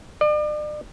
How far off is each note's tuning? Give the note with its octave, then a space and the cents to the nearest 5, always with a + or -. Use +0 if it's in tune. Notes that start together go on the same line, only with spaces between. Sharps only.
D5 +40